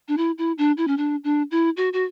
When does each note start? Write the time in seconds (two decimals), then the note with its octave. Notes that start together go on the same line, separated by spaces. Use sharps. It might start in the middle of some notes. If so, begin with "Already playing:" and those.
0.08 D4
0.17 E4
0.38 E4
0.58 D4
0.77 E4
0.87 C#4
0.97 D4
1.24 D4
1.51 E4
1.77 F#4
1.93 F#4